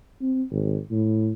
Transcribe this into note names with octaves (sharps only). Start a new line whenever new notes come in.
C4
G#1
A2